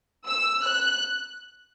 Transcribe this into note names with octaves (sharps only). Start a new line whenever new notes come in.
E6
F#6